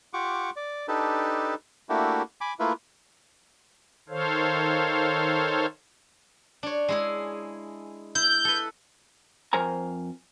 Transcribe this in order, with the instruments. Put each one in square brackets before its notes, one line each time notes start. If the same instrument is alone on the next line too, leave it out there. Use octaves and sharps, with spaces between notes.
[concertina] F4 G4 F#5 C#6 D6
D5
D4 D#4 G4 A4 B4
A3 A#3 D4 E4 F#4 G4
G#5 B5 D6
A3 A#3 E4 F4 B4
[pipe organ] D#3 A4 C5 C#5 F5
[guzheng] D4 C#5
G#3 E4 G#4
[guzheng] E4 [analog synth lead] G6
[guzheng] A4 B4
[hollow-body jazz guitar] F2 A#4 C5 G#5 A#5